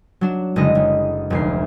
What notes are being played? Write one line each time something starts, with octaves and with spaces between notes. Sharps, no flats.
F#3 D4 E7
F#1 D3 G#3 D#5
F#1
F1 D2 C7